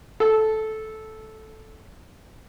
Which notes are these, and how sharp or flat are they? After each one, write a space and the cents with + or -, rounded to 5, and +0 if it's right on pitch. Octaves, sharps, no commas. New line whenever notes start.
A4 -10